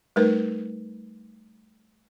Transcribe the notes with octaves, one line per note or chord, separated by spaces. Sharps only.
G3 A3 D#4 A#4 B4